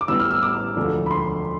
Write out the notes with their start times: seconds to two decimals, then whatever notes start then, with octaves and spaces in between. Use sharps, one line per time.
0.01 D6
0.08 A1 A2 G3 B3 E6
0.20 F6
0.31 E6
0.42 D6
0.76 E1 D2 D3 F3 A3
1.06 B5
1.11 C6